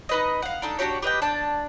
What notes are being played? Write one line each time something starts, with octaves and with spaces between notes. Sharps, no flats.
D#4 B4 D#5
F5 F#5
D4 D#4 A4
D4 F#4 G4 C#5
G4 B4 D#5 G5
D4 A5